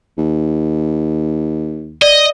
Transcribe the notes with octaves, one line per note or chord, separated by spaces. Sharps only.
D#2
D5 D#5